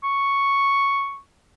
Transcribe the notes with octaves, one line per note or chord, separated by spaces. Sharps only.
C#6